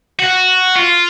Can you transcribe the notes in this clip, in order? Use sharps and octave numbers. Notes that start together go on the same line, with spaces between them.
F#4
F4